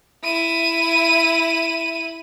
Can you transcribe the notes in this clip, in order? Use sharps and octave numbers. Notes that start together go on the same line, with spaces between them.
E4 D#7